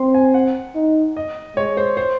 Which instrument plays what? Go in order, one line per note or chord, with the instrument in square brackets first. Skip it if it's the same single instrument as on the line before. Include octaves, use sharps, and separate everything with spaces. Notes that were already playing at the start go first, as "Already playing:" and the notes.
Already playing: [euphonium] C4 [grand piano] C6
[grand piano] G#5
F#5
[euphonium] D#4
[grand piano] D#5
[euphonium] G#3 [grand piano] C#5
[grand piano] C5
C5